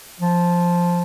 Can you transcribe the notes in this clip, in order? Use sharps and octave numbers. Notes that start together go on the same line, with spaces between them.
F3